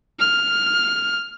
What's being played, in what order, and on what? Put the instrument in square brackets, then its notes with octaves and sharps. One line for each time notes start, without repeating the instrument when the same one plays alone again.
[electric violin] F6